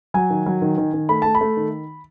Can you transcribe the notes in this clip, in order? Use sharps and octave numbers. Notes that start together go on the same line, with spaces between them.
F#3 G#5
D#3
F#3
D#3
D#3
D#3
A3 B5
A3 A5
B5
A3
D#3